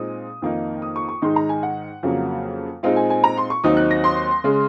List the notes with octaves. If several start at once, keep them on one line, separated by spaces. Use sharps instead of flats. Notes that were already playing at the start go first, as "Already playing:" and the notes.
Already playing: A#2 G#3 C4 D#4 D#6
F2 D#3 A#3 D#4
D#6
C#6
C#6
G#2 D#3 G#3 D#4 C6
A#5
G#5
F#5
F2 C#3 F#3 A#3
A#2 G#3 C4 D#4 F5
G#5
G#5
A#5
C6
C#6
D#2 D#3 F#3 C4 D#4 D#6
F#6
A#6
C6
C#3 G#3